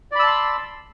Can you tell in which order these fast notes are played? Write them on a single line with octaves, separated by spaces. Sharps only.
D5 B5 E6 A5 C6